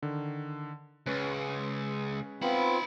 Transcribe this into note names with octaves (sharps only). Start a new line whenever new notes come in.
D3 D#3
C#2 G#3 C#4 B4
B3 C4 D#4 F4 B5